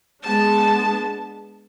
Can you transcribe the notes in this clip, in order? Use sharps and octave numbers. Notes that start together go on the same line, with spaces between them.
G#3 B3 D4 A5